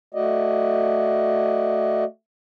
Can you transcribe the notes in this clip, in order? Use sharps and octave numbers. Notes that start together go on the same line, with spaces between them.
A3 F#4 D5 D#5